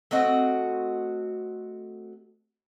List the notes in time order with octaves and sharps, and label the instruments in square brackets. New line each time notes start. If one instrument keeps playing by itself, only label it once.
[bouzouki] A3 C4 F#4 D#5